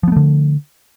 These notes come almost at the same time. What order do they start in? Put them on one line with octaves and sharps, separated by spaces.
F3 B3 A3 D3